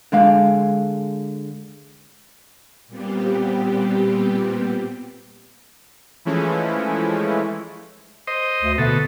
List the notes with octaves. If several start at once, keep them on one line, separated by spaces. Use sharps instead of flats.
D3 G#3 F5
A#2 G3 B3 C4 G4
E3 F3 G#3 A3 C#4 E4
C5 D#5
D2
B2 D3 A4